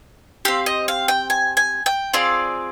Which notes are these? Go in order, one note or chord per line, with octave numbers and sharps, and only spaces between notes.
C4 G4 F5
D#5
F5
G5
G#5
G#5
G5
C4 F4 G#4 D5